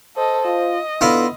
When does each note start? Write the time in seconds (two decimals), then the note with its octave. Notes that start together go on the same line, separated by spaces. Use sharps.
0.17 A4 C5 D#5
0.45 F4 D#5
1.01 D3 B3 E4 F4